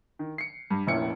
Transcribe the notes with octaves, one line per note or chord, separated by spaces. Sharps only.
D#3
C7 C#7
G2
F1 A#1 A#2 C#4 E4 C#7